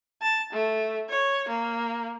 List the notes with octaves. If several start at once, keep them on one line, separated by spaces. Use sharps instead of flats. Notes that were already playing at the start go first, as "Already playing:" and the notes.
A5
A3
C#5
A#3